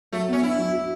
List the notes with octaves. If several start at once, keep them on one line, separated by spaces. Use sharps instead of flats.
F#3 A3
B3 C#4
D4 E4
F#3
F#4